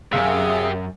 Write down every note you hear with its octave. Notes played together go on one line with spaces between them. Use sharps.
B1 F#2 G4 G#4 E5 F5 D#6